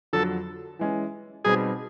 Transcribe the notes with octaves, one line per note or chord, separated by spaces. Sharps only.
F2 D3 F#3 A4
E3 G#3 C#4
B2 G3 C4 D#4 G#4